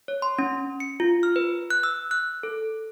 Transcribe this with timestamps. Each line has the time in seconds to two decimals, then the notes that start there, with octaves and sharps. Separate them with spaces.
0.08 C#5
0.22 C6
0.39 C#4
0.80 C#7
1.00 F4
1.23 F6
1.36 B4
1.70 F#6
1.83 E6
2.11 F#6
2.43 A4